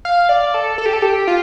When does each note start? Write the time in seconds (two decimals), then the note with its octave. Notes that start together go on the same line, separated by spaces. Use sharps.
0.05 F5
0.29 D5
0.54 A4
0.78 A4
0.86 G4
0.93 A4
1.02 G4
1.27 F4